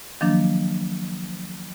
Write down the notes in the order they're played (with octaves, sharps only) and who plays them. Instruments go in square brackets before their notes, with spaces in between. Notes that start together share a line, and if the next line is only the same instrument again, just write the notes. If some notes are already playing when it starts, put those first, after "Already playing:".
[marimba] D#3 F3 F#3 A#3 D4